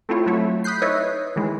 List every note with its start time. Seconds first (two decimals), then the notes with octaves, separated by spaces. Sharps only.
0.09 A3 C4 E4 F4 C#5
0.26 F#3 A3 E4 C#5
0.64 B5 D#6 F#6 G6 C7
0.82 D#4 E4 A4 B4 C#5 D#5
1.36 D#3 E3 G#3